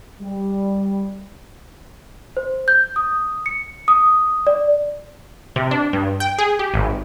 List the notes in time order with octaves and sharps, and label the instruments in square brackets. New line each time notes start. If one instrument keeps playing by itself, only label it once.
[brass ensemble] G3
[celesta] C5
G6
D#6
C#7
D#6
D5
[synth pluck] C3
D4
G2
G5
G#4
G4
G#1